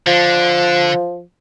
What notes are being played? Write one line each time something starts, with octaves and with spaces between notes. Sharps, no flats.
D3 F3